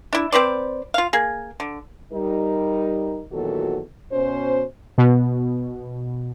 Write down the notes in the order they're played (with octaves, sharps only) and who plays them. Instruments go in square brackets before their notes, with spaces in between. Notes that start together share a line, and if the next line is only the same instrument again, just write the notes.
[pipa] D4 E4
C4 B4 C5 D5
F4 F5
A#3 G#4
D3
[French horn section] G3 D#4 A#4
E2 A#2 D#3 F#3 F#4 A4
B2 C#4 C5
[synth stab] B2